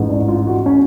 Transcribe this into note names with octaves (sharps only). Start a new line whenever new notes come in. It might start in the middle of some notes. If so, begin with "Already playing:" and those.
Already playing: A1 G#2
D4
F4
F#4
C#4